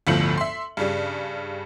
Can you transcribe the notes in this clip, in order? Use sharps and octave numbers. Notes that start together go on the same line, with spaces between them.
G1 D2 A2 F3 C#7 F#7
E5 C6
G2 C#3 G3